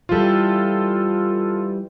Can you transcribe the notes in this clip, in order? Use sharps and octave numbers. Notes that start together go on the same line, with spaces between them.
E3 G3 F4 A4